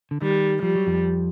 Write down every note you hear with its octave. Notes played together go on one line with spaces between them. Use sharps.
D3
D#3 G3
F3 G3
F#3
F2 F3